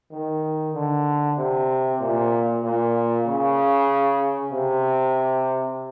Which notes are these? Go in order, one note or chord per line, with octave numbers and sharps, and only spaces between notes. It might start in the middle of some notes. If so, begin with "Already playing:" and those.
D#3
D3
C3
A#2
A#2
C#3
C3